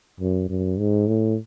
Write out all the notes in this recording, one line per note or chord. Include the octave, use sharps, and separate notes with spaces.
F#2
F#2
G#2
A2